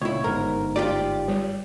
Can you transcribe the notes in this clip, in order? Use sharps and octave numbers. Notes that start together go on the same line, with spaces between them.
C#2 A#2 E4 C#5
G1 G#2 A#4
F4 G4 D5
G3